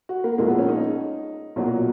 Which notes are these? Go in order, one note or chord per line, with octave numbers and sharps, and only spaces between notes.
F#4
A#3
A#1 A#2 G#3 A#3
B3
C#4
D#4
B1 A#2 F#3